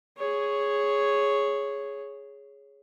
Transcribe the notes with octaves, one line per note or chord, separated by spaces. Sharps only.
G#4 C#5